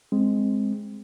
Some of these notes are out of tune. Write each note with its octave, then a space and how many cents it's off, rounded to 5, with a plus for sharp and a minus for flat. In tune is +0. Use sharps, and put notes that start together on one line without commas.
G#3 +0 C4 +0